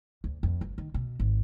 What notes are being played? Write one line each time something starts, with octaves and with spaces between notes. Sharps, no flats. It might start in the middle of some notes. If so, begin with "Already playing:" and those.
D2
F2
G1
D#3
B2
G#1